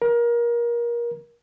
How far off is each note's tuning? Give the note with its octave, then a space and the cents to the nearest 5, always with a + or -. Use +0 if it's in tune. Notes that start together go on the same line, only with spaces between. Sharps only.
A#4 +25